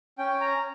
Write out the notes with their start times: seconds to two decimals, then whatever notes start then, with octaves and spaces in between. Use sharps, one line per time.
0.18 C#4 G5
0.41 A#5